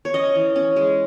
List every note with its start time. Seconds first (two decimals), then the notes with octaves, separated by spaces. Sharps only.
0.05 C#5
0.14 C#4 D#5
0.35 E3
0.56 C#4
0.76 G#3